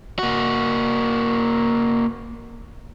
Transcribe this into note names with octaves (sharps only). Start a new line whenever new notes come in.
A#3 F#4